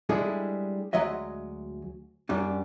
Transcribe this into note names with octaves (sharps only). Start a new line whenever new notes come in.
G3 G#3 D4 E4 G#4 A4
D2 F#3 G#3 D#5 E5
F#2 G3 D4